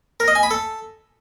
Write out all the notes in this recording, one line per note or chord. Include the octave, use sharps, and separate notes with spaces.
A#4
D#5
G#5
B5
A4